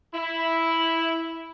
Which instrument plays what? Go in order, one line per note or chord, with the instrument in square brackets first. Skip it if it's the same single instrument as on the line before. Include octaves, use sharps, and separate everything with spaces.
[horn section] E4